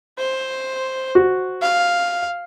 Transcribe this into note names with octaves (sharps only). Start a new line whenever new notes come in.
C5
F#4
F5